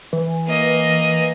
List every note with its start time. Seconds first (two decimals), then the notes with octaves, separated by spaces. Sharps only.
0.13 E3
0.47 A#3 D#5